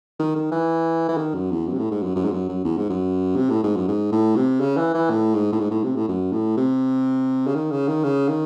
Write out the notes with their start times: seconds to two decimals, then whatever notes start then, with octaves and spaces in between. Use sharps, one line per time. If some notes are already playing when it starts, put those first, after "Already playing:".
0.19 D#3
0.36 D#3
0.51 E3
1.09 E3
1.17 D#3
1.34 F#2
1.51 E2
1.67 F#2
1.74 C3
1.79 A2
1.91 G#2
2.03 F#2
2.16 F#2
2.24 G#2
2.32 F#2
2.49 F#2
2.65 E2
2.77 G#2
2.89 F#2
3.36 C3
3.50 A2
3.63 G#2
3.76 F#2
3.88 G#2
4.12 A2
4.36 C3
4.60 C#3
4.77 E3
4.94 E3
5.10 A2
5.34 G#2
5.52 A2
5.60 G#2
5.71 A2
5.84 C3
5.96 A2
6.09 F#2
6.33 A2
6.57 C3
7.47 C#3
7.55 D#3
7.71 C#3
7.88 D#3
8.04 C#3
8.29 D#3